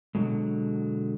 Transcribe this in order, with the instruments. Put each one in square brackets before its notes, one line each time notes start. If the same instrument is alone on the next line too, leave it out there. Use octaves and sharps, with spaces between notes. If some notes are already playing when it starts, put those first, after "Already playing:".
[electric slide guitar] B2 D3 D#3 F#3 G#3